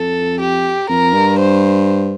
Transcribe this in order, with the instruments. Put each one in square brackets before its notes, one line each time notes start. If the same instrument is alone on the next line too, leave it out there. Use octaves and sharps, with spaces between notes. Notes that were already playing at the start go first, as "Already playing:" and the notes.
Already playing: [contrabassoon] F2 [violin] A4
[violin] G4
[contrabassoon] F2 [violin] A#4
[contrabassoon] G2
[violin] C5